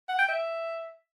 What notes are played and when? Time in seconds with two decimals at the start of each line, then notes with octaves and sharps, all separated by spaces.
0.09 F#5
0.19 G5
0.29 E5